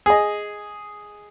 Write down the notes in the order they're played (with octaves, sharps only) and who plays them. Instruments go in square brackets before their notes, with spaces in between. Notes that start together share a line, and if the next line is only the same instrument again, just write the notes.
[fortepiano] G#4 D#5